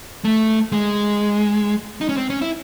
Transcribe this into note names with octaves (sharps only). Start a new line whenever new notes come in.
A3
G#3
D#4
C#4
C4
C#4
E4